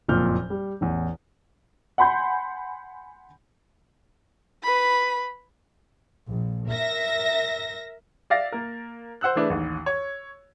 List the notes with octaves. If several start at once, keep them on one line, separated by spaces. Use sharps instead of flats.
F#1 F2 A#2 F6 G6
G3
A1 E2
F#5 G#5 B5 C6 G6
B4 B5
A#1
A#4 E5 A#6
D5 E5 F5 A6 A#6
A#3 A#4
C5 F#5 E6 F#6
E3 A3 D4 G#4 B4
A1 D#2
C#5